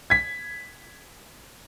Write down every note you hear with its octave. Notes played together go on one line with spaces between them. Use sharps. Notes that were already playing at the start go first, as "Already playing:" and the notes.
G#6 B6